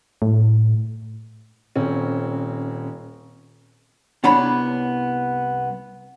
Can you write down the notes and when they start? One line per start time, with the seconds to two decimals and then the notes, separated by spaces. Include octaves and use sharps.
0.22 A2
1.75 D#1 C4 C#4
4.24 C2 B3 D4 C#5 B5